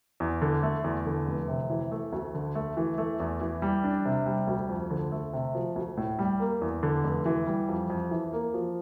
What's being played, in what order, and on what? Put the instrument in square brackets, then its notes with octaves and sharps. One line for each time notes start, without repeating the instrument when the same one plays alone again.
[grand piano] E2
D3
A3
E2
D3
F1
C3
E3
A3
D2
D3
A3
E3
A3
E2
E3
G3
D4
C3
G3
D2
F2
D3
A3
C3
F3
D2
A2
G3
A#3
E2
D3
F1
E3
G3
F2
F2
E3
A#3
F3